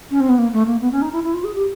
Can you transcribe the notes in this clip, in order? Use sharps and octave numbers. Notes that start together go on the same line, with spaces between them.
C#4
C4
B3
A#3
A3
A#3
B3
C#4
D#4
E4
E4
F4
G#4
G4